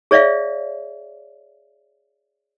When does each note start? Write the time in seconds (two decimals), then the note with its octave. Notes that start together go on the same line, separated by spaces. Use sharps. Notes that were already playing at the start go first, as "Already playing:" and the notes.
0.11 G#4 C#5 D5 E5 F5